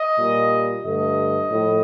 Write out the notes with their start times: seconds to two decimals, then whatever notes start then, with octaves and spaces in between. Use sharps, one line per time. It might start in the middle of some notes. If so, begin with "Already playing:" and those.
Already playing: D#5
0.18 A#2 G3
0.84 G2 D3 A3 D#5
1.51 A2 F3 A3